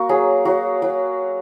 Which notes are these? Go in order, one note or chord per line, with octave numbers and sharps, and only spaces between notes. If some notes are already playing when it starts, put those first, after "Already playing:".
Already playing: A#3 F#4
F#3 G#4
F#3 F#4
F#3